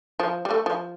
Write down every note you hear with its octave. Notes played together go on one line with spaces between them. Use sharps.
F3
G3
A3
F3